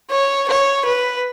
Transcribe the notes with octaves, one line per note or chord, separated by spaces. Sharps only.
C#5
C#5
B4